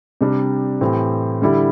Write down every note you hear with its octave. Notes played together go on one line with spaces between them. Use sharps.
C3 G3 D4
A2 E3 C4 E4 G4
D3 G3 E4 G4